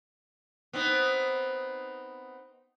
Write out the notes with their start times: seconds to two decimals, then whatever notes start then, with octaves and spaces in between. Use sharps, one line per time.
0.73 B3 C4 D#4